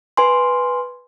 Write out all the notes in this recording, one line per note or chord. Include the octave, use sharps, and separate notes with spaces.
B4 G#5 C6